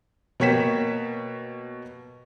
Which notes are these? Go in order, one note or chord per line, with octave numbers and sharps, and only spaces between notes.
B2 A#3 C#5 G5 B6 E7